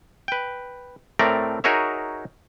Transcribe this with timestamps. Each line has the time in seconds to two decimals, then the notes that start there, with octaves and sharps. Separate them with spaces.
0.28 B4 G5
1.19 A2 A3 C4 A#4 D5 A#5
1.64 D#4 F#4 G#4 A#4 C#5 E5